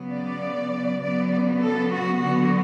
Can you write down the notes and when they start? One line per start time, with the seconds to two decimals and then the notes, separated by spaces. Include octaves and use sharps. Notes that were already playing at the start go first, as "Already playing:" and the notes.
Already playing: C#3 F#3 B3
0.10 D5
1.01 C#3 F#3 B3 D5
1.62 A4
1.93 F#4
2.22 D3 F#3 B3 F#4